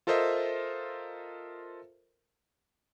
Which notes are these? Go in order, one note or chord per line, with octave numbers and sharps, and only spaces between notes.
F4 A4 A#4 C5 D#5 E5